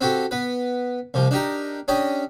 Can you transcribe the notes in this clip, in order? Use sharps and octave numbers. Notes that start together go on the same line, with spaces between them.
C4 F#4 G4 A4
B3 B4
C2 C3 F3
D4 D#4 G4 A#4
C#4 D4 G4 D#5